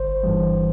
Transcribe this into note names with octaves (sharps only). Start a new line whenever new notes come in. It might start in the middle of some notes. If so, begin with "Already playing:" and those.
Already playing: G1 C5
G2 E3 G3